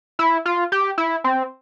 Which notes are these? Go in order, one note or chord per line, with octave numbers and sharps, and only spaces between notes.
E4
F4
G4
E4
C4